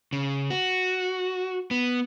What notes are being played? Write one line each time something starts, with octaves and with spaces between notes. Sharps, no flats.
C#3
F#4
B3